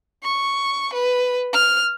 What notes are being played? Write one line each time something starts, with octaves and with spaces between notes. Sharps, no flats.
C#6
B4
F6